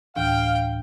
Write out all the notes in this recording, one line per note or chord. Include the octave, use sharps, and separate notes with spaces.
D2 A2 E3 F5 G5